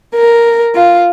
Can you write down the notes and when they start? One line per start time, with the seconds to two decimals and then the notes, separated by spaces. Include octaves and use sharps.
0.15 A#4
0.74 F4